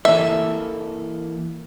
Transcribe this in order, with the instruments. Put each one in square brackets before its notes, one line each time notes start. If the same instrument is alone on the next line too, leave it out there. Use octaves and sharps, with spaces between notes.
[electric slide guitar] E3 A#3 A4 [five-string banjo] E5